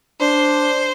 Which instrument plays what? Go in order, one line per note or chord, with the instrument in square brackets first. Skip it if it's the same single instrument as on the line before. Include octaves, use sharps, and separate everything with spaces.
[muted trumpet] D4 [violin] C5